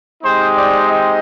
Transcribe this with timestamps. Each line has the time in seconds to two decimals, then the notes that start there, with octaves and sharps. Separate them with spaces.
0.23 G#3 C4 D#4 G4 C5
0.56 D5
0.88 D#5